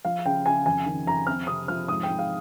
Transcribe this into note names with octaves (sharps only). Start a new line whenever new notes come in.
F3 F5
C#3 G5
C#3 G#5
F2 G#5
D#3
F2 A#5
C4 F6
C3 D#6
F3 F6
G#2 D#6
G5
G#2
F5